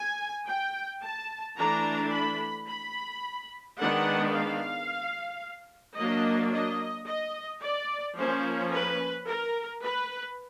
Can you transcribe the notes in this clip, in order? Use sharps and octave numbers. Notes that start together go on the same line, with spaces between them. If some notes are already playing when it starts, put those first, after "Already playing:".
Already playing: G#5
G5
A5
E3 A3 D4 A#5
B5
B5
D#3 G#3 B3 D4 F#5
F5
F#3 A#3 D4 D#5
D#5
D#5
D5
F3 A#3 C#4 C5
B4
A#4
B4